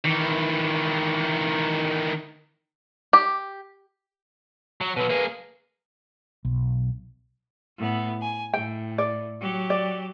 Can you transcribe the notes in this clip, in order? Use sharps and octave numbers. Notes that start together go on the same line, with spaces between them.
D#3 E3
G4
F#3
B2 F#3 B4
A#3 G#4
B1
A2 B3
G#5
A2 G5
D5
F#3 G4
D5